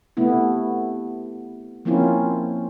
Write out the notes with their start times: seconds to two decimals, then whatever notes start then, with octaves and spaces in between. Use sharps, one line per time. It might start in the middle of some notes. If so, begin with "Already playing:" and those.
0.17 C3 A3 B3 E4
1.85 F3 A#3 C4 C#4 E4 F4